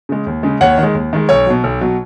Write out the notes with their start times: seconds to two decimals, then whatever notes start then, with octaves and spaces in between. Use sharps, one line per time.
0.09 C#3 G#3
0.27 D#2
0.43 C#3 G#3
0.61 D#2 C#5 F#5
0.78 D#3
0.83 G#3
0.95 D#2
1.13 D#3 G#3
1.29 B1 C#5
1.46 B2 F#3
1.64 B1
1.81 B2 F#3